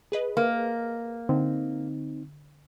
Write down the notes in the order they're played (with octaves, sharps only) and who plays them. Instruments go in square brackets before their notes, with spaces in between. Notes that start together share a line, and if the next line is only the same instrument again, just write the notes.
[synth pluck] G#4 B4 D#5
[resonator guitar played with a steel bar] A#3
[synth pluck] D3 [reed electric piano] C4 D#4